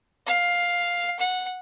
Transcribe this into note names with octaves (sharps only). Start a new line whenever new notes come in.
F5
F#5